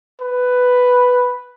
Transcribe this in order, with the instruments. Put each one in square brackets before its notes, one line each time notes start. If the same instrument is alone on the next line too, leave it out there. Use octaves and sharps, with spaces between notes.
[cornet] B4